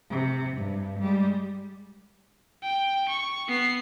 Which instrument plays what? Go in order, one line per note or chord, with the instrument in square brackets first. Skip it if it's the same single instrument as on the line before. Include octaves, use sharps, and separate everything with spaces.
[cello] C3
G2
G3 G#3
[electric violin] G5
C#6
B3 C7